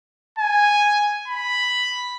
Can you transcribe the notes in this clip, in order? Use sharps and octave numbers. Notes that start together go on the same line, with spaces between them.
G#5
B5